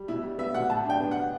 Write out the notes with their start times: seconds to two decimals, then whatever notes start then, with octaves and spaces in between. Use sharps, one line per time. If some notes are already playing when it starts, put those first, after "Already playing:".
Already playing: G3
0.08 B2 E4
0.23 G3
0.38 B3 E5
0.54 B2 F#5
0.70 A2 A5
0.85 D4 G5
1.00 B3
1.11 F#5
1.16 D4